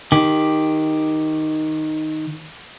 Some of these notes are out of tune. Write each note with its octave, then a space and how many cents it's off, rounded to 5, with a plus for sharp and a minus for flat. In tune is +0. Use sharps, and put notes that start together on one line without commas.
D#3 +0 G4 +0